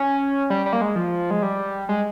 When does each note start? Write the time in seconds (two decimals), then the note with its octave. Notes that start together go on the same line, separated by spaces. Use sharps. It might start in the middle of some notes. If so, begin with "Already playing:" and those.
Already playing: C#4
0.50 G3
0.66 G3
0.73 A#3
0.81 G#3
0.96 F3
1.31 G#3
1.42 G3
1.89 G#3